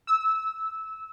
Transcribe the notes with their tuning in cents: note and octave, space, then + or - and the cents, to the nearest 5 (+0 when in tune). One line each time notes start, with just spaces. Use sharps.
E6 -20